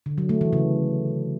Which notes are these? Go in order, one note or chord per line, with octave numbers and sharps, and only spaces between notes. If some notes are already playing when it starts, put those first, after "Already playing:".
D3
F#3
A3
E3
C#3